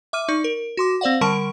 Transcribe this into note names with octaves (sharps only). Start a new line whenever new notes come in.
E5 D6 F6 D#7
D#4 D5 C#6
A#4
F#4 C6 D6
C4 C5 D5 F5 F#5
D3 G3 A#4 A5 C#6 D7